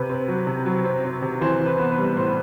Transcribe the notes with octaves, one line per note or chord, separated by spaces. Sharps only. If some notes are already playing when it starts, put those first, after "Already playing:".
Already playing: C3 B4
C4
F#3
C3
F#3
C4
C4
C3
E3 C4 C5
E3
B4
B3
B4
G3
A2 C4 C5